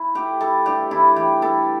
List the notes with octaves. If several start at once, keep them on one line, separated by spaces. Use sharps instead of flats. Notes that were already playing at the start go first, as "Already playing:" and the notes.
Already playing: E4
A3 G4
E4 A4
G2 G4
E3 E4
E3 G4
E4 A4